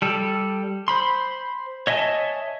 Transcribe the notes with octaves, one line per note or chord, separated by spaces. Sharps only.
G3 A4
C5 B5 C6
C#5 D#5 E5 G#5 A5